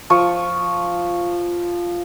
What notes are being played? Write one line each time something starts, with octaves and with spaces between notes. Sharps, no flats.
F3 C#6